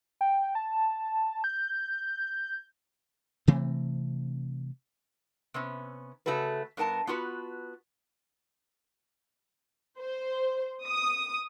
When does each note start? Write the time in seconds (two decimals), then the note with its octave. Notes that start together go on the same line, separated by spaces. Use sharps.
0.21 G5
0.55 A5
1.44 G6
3.48 C3 E3 A3 C4
5.54 C3 B3 C#4
6.26 C#3 A3 F#4 A4 B4
6.77 G2 B3 A#4 G#5 A5
7.07 B3 F4 F#4 B4
9.99 C5
10.85 D#6